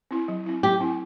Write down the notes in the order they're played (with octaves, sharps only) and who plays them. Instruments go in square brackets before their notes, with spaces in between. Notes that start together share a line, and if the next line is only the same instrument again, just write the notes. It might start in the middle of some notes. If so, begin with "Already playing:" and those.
[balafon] C4 E4
F#3
C4 E4
[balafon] F#3 [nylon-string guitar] G4
[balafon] C4 E4